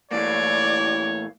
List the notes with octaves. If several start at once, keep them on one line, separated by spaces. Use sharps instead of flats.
A2 E3 A#3 C#5 D5